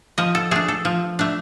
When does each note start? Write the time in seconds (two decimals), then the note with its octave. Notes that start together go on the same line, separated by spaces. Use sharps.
0.18 F3 D#5
0.35 A4
0.51 A3 D4 G#4
0.68 A4
0.85 F3
1.19 A3 D4